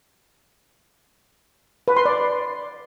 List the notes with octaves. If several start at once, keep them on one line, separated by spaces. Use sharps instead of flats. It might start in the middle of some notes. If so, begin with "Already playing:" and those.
B4
C6
D5